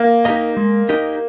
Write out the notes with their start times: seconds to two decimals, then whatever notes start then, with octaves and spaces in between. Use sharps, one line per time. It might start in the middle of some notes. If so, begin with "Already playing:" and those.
Already playing: A#3
0.25 D#4 G4 A#4 D#5
0.57 G#3
0.89 D#4 G4 A#4 D#5